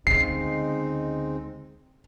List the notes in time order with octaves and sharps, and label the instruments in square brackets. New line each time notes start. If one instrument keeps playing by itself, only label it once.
[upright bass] D2 C#3 [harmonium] G#3 C4 D#4 [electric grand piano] C7